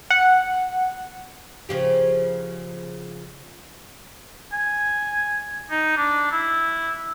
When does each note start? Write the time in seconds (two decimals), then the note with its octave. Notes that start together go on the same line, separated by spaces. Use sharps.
0.10 F#5
1.69 C#3 F3 G4
4.53 G#5
5.70 D#4
5.97 D4
6.31 E4